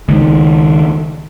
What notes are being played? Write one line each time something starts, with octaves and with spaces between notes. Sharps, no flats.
C#2 D#3